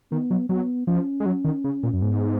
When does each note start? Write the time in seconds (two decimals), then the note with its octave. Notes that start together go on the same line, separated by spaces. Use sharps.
0.11 D#3 B3
0.31 F#3
0.49 F#3 B3
0.87 F3 C#4
1.20 G#3
1.26 F#3
1.45 D#3
1.64 C#3
1.83 A#2
1.94 F#2
2.01 G#2 B3